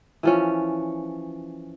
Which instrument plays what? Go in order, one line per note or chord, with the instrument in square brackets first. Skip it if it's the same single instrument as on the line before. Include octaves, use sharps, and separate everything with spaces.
[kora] E3 F3 C#4